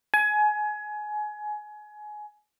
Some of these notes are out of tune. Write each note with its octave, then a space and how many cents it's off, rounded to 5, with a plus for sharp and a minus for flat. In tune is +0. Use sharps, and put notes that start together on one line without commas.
G#5 +25